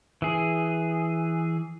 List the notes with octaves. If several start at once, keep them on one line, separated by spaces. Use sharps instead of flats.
E3 G#4